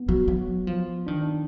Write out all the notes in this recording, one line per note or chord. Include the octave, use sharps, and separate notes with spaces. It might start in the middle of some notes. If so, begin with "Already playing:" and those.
Already playing: B3
F#3
F#3
F3
D#3 D4
D4